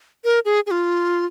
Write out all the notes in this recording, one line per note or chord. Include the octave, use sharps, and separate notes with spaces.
A#4
G#4
G#4
F4